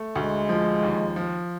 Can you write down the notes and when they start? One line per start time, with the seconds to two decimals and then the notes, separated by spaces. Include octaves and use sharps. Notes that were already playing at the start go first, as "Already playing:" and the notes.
Already playing: A3
0.16 D2 G#3
0.49 F3
0.83 D#2
1.16 F3